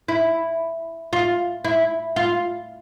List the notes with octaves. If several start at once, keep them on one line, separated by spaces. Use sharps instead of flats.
E4
F4
E4
F4